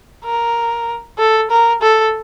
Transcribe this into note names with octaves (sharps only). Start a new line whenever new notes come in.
A#4
A4
A#4
A4